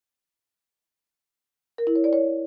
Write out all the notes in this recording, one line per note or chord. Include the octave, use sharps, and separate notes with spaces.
A#4
E4
C#5
D5
C#5